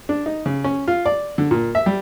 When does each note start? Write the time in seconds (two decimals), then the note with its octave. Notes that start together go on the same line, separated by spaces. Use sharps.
0.09 D4
0.26 D#4
0.46 C#3
0.64 C#4
0.88 F4
1.06 D5
1.38 D3
1.51 A#2
1.75 E5
1.86 G3